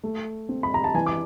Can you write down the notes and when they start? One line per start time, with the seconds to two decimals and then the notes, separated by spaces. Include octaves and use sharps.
0.03 A3
0.49 C4
0.63 B5
0.74 A#5
0.84 A5
0.94 E3 G#5
1.06 D6